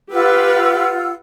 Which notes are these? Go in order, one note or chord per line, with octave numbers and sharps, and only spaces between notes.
F4 G4 B4 F#5 E6